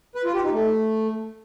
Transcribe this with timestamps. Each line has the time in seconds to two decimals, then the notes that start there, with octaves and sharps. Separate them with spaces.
0.15 B4
0.25 F4
0.34 G4
0.43 D#4
0.53 A3